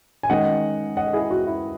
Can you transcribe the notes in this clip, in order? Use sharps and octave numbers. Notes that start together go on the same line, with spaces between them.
G#5
D#3 G#3 C#4 D#5 F#5
D#5 F#5
E4 G#4
F#4
E4